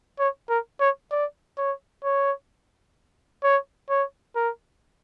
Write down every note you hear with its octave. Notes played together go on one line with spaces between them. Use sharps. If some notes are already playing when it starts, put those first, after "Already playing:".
C#5
A#4
C#5
D5
C#5
C#5
C#5
C#5
A#4